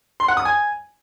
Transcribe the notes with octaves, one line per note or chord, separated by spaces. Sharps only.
C6
F#5
D#6
G#5